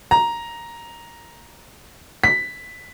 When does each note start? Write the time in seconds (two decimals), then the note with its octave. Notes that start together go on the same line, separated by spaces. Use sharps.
0.11 A#5
2.24 B6